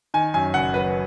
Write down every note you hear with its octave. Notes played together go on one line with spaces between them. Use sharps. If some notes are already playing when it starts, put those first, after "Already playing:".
D#3 G#5
F#2 G#5
F#1 F#5
F#3 B4